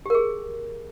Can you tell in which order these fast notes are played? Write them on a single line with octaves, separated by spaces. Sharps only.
G4 A#4 G#4